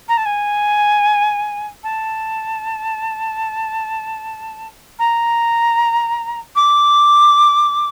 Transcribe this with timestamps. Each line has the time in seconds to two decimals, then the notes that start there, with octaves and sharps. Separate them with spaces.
0.08 A#5
0.17 A5
0.25 G#5
1.83 A5
4.99 A#5
6.55 D6